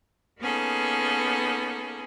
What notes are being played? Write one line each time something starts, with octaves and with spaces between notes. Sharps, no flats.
A#3 B3 C#4 D#4 G#4 A4